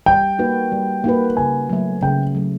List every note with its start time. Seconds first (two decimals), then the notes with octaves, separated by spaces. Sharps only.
0.06 G3 G5
0.39 A#3 D#4 F#4 B4
0.72 G3
1.04 A#3 D#4 F#4 B4
1.37 C#3 G#5
1.70 F#3 A3
2.02 C#3 G5
2.35 F#3 A3